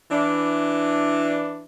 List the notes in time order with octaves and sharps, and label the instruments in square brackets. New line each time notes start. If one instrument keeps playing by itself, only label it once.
[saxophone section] E3 D4